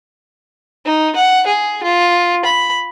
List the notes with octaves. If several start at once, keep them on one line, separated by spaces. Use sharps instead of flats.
D#4
F#5
G#4
F4
B5